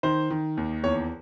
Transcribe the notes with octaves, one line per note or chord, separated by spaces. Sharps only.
D#3 C5
D#3
D#2
E2 C#5